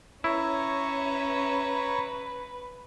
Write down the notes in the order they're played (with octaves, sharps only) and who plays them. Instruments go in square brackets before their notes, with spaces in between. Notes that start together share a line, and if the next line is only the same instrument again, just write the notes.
[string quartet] C#4 E5 [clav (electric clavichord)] E4 [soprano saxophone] B4 [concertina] C#5 A#5 C#6